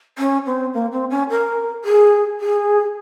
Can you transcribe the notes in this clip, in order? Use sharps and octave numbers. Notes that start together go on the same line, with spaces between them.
C#4
C4
A#3
C4
C#4
A#4
G#4
G#4